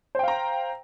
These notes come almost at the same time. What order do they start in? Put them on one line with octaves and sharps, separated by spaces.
C5 G5 F5 A#5